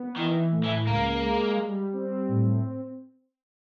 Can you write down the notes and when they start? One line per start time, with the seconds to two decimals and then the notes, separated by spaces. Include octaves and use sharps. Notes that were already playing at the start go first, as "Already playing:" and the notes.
Already playing: B3
0.16 D#3 E3
0.51 A2
0.64 E3
0.87 C#2 A#3
1.22 G#3
1.57 G3
1.93 C4
2.28 A2